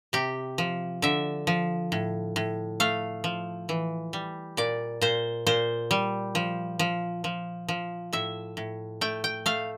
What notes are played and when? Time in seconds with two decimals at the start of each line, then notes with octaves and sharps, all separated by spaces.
0.13 C3 G4
0.58 F3
1.02 D3 E5
1.47 F3
1.92 A2
2.36 A2
2.80 A3 F5
3.24 F3
3.69 E3
4.13 G3
4.57 A#2 D5
5.01 A#2 C5
5.47 A#2 C5
5.91 G3
6.35 F3
6.79 F3
7.24 F3
7.68 F3
8.13 A2 E5
8.57 A2
9.01 A3 G5
9.24 G5
9.46 A3 F5